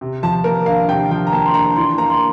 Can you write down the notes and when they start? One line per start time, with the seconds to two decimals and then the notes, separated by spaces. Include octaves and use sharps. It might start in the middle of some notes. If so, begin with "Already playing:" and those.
0.01 C3
0.23 F3 A5
0.44 A#3 A#4
0.66 D4 F5
0.89 C3 G5
1.10 F3 G5
1.27 A#5
1.32 A#3 A5
1.46 C6
1.54 D4 A#5
1.76 E3 C6
1.98 A#3 A#5
2.10 C6